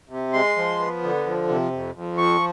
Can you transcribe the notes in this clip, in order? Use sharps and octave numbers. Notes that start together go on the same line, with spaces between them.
C3
G#3 C6
F3
B3
D3
F3
C3
F2
F2
F3 C#6